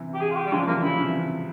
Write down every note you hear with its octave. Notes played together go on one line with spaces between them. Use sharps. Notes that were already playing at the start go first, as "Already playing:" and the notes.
Already playing: C3 E3
G4
G#4
F4
G4
G3
C#3 F3 G#3
E3 G3 A#3
C#3 F3 E4
C3 E3